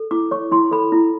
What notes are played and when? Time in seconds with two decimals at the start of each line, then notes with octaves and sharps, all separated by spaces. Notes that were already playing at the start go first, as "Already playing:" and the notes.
Already playing: A4
0.11 E4 D6
0.31 C#5 C#6
0.51 E4 C6
0.71 A4 B5
0.92 E4